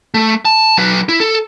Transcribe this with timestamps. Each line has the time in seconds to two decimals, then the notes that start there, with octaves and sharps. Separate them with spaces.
0.14 A3
0.45 A5
0.78 F#3 B4
1.09 E4
1.20 A4